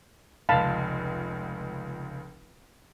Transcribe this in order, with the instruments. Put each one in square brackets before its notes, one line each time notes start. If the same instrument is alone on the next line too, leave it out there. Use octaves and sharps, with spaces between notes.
[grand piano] F1 C#2 [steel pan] F5 A5 B5